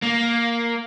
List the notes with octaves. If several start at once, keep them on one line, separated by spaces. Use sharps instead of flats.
A#3